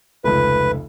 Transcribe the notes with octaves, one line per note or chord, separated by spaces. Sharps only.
F1 C#2 B4